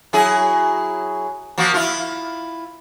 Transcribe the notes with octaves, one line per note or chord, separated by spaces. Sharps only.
F#3 E4 G#4
F3 A#3 F#4
E4 F4